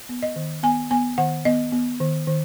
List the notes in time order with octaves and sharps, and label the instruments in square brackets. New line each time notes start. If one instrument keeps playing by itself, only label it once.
[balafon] B3
D#5
D#3
B3 G#5
B3 G#5
D#3 F#5
B3 D#5
B3
D#3
D#3